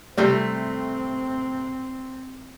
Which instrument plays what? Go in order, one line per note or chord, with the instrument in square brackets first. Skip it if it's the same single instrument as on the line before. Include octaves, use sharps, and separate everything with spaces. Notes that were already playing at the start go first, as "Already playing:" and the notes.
[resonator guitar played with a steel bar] C3 A3 [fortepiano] G3 [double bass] C4